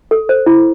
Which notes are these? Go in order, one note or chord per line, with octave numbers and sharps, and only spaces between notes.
A4
C5
E4